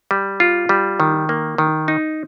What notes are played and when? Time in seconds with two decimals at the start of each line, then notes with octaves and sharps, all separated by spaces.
0.11 G3
0.40 F4
0.69 G3
1.00 D#3
1.29 A#3
1.58 D#3
1.88 D#4